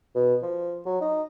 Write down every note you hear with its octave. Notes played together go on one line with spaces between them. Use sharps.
B2
F3
F#3
D#4